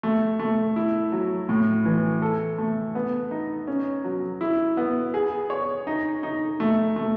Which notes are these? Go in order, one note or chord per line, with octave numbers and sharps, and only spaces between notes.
A3
A3
E4
F#3
A2
E3
A4
A3
B3
D#4
C#4
F#3
E4
B3
G#4
C#5
D#4
D#4
A3
A3